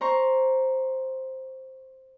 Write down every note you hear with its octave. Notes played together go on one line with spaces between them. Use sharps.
C5 A#5 C#6